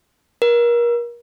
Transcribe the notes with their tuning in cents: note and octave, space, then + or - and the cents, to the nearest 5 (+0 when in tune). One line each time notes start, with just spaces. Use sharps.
A#4 +30